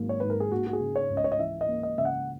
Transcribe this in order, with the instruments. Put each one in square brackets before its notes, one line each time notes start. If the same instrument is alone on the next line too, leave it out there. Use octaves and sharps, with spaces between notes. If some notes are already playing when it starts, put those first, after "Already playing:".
Already playing: [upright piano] G#1 G#2 F#3 A#3 [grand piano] A#4
[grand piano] C#5
[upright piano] G#2 [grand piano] B4
[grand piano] A#4
G#4
[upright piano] A#3 [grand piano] F#4
[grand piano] F#4
G#4
[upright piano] C#3
[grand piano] C#5
[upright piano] C#2
[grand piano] D#5
C#5
D#5
[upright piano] E3 [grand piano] E5
[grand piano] D#5
[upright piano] A#3
[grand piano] D#5
[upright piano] C#3 [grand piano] E5
[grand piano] F#5